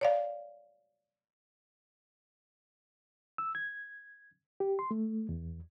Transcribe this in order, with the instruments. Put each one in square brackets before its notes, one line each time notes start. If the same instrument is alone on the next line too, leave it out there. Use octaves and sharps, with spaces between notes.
[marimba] C#5 D5 F5
[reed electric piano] E6
G#6
G4
C6
A3
E2